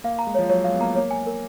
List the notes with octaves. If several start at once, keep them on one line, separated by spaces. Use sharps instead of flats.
A#3 F5
A#5
G#3
F3 C#5
F#3 C#5
G#3 F5
B3
A#3 A#5
A#3 C#5
G#5
A#4